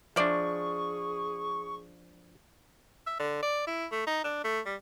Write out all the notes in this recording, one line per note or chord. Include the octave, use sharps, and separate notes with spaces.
F3 G#3 D4 G#4 D5 E5 C#6
E5
D3
D5
E4
A3
D#4
D4
A3
G3